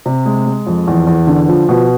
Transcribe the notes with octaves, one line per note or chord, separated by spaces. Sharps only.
C3
G#3
G#3
F2
E2
E2
D3
F3
B2